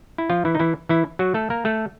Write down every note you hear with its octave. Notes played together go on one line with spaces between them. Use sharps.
E4
F3 F4
E3 E4
D#4
E3 E4
E3 E4
F#3 F#4
A3 A4
A#3 A#4
A3 A4